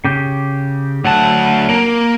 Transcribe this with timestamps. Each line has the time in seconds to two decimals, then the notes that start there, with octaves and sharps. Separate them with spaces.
0.04 C#3 G4
1.05 D2 F#3 F#5 A5
1.69 A#3